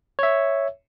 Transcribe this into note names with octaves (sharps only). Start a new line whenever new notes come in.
C#5 E5